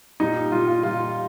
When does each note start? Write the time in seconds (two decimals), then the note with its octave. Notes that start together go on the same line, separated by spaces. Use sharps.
0.20 A#2 G3 D#4
0.52 A#2 G3 F4
0.67 F4
0.83 A#2 G3 F4